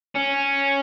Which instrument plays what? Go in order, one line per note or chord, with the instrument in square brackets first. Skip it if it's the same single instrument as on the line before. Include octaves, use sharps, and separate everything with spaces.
[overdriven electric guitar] C#4